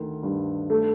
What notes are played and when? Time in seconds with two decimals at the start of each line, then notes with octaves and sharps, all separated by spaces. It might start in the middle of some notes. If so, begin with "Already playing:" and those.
Already playing: D2 D#3
0.23 G2
0.70 A3